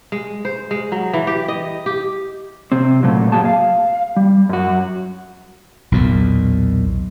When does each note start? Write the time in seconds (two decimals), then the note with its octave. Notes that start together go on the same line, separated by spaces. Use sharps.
0.12 G#3
0.45 C5
0.71 G#3
0.92 F#3
1.13 E3
1.27 G4
1.48 D#5
1.86 G4
2.72 C3 C4
3.03 A#2 C#3 F#3 A3
3.32 F#2 F#3 A#3 G#4 A5
3.45 F5
4.17 G3
4.49 F#2 F#4
5.92 B1 E2 A#2